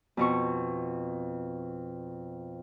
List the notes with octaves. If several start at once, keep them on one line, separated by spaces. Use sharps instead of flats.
F2 B2 C#6